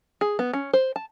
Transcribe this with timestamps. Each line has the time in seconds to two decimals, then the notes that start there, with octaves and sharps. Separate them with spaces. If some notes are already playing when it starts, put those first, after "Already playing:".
0.21 G#4
0.39 B3
0.53 C#4
0.73 C5
0.96 A5